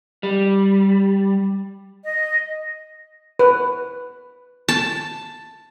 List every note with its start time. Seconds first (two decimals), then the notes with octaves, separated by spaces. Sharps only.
0.23 G3
2.04 D#5
3.39 B4
4.69 A5